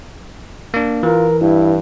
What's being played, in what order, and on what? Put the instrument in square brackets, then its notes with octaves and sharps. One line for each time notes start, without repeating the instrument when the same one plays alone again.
[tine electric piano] A#3 D4
[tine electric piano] E3 [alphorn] F4 [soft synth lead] A#4
[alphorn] G2 [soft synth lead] E4